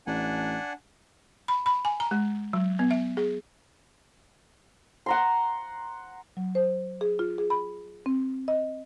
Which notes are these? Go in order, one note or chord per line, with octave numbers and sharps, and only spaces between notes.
A1 D4 F#5 G#5
B5
B5
G#5
A#5
G#3
F#3
B3
E5
G#4
F#5 A#5 C6
F#3
C5
G#4
F4
G#4
B5
C4
D#5